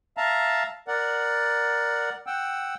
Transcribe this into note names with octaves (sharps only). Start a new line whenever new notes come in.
E5 F5 A5 A#5
A#4 D5 F#5
F#5 G5 E6